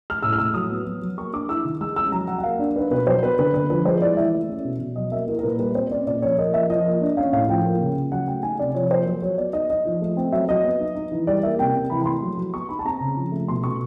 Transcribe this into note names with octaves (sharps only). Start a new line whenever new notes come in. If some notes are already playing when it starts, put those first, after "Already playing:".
F6
A2 E6
F6
A2 E6
F#3 D#6
B3
F#3
F#3
A#3 C#6
D4 D6
E4 E6
D#3
G#3 E6
C#4 E6
F#3 A#5
F#3 F#5
F#5
A#3 F5
D4
D#4 B4
B2 B4
F#3 C5
B3 B4
D3 B4
D3 B4
F3 B4
G#3 C5
E4 D5
E3 E5
A3
C#4
B2
B2
F#3 D#5
A#3 E5
E4 A#4
A#4
A#2 B4
G3 B4
C4 C5
C#4 D5
A#2 D5
F3 C#5
A#3 D#5
F3 E5
F3 D#5
A#3
D4
C#4 F5
A2 F5
F3 G5
A#3
C#3
C#3
F#3 F#5
A3 G5
D#4 G#5
C3 D5
F3 C#5
A#3 C5
F#3
F#3 C#5
B3 D5
D#4 D#5
D#4 D#5
F3
A3
C4
F#3 E5
F#3 D#5
B3
D#4
D#4
E3
G3 D5
A#3 E5
C3 G5
C3
E3 B5
B5
A3 C6
F#3
F#3
B3 C#6
D#4 B5
A5
C4 A#5
C#3
F3
A3
B2 C6
B2 C#6